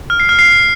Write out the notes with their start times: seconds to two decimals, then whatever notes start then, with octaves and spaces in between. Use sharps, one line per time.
0.10 F6
0.20 C7
0.29 F6
0.39 C7